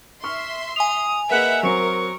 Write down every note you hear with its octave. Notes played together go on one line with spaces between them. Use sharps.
E5 C6 C#6 F6
G#5 D#6 F7
A#3 G#4 B4 D#5 E5 F#5
F#3 C4 A#4 C#6